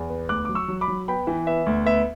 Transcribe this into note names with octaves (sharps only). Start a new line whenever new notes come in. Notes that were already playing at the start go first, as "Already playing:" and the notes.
Already playing: E2
B3
D2 D6 F#6
F#3 D6
C#6 E6
F#3
B5 D6
F#3
B3 G5 B5
E3
B3 E5
D2
B3 E5